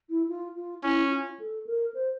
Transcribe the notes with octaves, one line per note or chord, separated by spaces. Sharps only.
E4
F4
F4
C#4 E4
F4
A4
A#4
C5